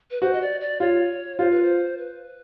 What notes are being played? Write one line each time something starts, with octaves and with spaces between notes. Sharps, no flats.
B4
F#4 C5
D#5
D5
D5
F4 C#5
F4 C5
B4
C5
B4